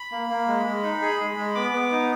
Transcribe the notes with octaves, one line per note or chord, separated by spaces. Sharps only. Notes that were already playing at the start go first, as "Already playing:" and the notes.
Already playing: B5
A#3
A#3
G#3
G#3
D#4
G#4
G#3
G#3
B3 D6
B3
D#4